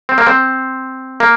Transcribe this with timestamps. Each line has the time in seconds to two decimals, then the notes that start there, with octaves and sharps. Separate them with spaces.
0.09 C4
0.18 A#3
0.26 C4
1.20 A#3